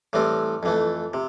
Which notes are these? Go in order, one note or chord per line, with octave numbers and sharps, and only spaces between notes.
A2 E3 G3 C4
F2 E3 A3
C3